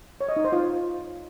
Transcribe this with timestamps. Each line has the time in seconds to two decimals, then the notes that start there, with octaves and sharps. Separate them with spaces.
0.21 C#5
0.29 D#5
0.37 D#4
0.45 C5
0.53 F4